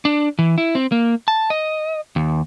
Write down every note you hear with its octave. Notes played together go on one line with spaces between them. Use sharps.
D4
E3
E4
C4
A#3
A5
D#5
D#2